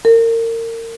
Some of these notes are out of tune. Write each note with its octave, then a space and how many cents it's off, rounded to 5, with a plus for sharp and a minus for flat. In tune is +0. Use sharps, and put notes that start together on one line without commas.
A#4 -30